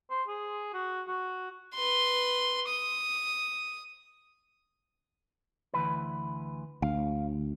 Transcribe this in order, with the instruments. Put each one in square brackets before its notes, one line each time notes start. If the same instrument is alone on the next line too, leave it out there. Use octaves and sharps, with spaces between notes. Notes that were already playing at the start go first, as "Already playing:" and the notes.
[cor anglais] C5
G#4
F#4
F#4
[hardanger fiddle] B4 C6
D#6
[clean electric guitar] D2 E3 B4
[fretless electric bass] D2 [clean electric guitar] F5